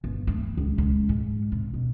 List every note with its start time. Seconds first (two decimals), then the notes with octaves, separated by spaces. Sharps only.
0.04 G1
0.27 A3
0.43 E3
0.57 C#2
0.78 C#2
1.09 G#2
1.52 C3
1.74 B2